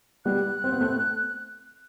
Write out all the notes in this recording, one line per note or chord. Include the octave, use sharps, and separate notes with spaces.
G3 B3 F#6
C4
B3
A3 C4